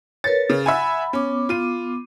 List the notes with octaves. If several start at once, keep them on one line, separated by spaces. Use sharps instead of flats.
A#4 B4 C#5 A6
C#3
E5 F#5 G#5 B5
B3 C#4 D6
F4 D#7